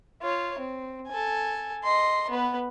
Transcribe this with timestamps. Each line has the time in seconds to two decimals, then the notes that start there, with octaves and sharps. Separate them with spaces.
0.22 F4 C#5
0.58 C4
1.08 A4 G#5
1.84 D#5 C6
2.30 B3 B4